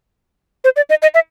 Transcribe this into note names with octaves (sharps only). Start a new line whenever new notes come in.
C5
D5
D#5
D#5
E5